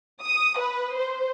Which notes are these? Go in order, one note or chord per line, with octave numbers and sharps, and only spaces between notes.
D#6
B4
C5